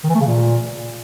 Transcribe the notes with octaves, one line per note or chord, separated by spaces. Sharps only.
D#3
E3
A3
C#3
A#2